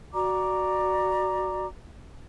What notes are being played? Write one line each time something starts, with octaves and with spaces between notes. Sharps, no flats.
F#4 D5 A#5 D6